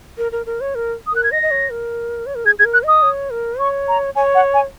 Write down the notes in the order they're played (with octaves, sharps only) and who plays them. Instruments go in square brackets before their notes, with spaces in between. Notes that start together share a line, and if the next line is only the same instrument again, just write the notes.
[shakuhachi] A#4
A#4
A#4
C#5
A#4
[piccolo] D#6
[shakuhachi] A#4 [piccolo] F#6
[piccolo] G#6
[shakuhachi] D#5 [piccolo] A#6
[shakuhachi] D#5
C#5
A#4
C#5
A#4
[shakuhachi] G#4 [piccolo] G#6
[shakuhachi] G#4 [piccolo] G#6
[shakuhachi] A#4
[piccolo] F#6
[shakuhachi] D#5 [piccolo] D#6
[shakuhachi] C#5
A#4
[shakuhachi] C#5 [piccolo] C#6
[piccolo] A#5
[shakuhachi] C#5 [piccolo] G#5
[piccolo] F#5
G#5